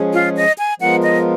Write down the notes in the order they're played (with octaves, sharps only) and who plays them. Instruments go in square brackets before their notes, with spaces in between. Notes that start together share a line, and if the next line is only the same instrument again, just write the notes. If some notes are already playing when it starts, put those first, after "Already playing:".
Already playing: [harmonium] F3 G#3 C#4 G#4
[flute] F4
D#5
G#5
[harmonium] F3 G#3 B3 F4 A#4 [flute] F#5
[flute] D#5